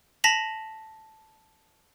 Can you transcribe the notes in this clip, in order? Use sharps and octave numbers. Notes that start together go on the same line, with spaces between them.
A5 A#6 B6 F7 F#7